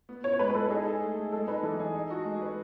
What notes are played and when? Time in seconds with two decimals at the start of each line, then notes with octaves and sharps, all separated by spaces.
0.09 B3
0.24 E4 C#5
0.34 C#5
0.39 G#3 B4
0.50 B4
0.54 G#3 A4
0.70 D#4 G#4
0.86 A4
1.02 A3
1.17 A3
1.32 G#3 A4
1.48 D#4 B4
1.63 E3 A4
1.79 G#4
1.95 D#4
2.10 F#4
2.25 G#3
2.41 B4